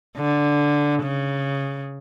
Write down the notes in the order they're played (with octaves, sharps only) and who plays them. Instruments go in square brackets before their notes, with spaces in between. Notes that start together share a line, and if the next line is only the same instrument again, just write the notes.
[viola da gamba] D3
C#3